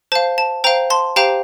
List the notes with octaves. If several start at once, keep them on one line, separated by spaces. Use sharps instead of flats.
C5 F5 A5
A5
C5 F5 G5 A#5
A5 C6
G4 C5 F5 G5 A#5